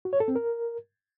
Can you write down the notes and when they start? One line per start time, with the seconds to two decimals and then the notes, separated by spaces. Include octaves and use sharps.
0.05 F#4
0.13 C#5
0.20 A4
0.28 C4
0.36 A#4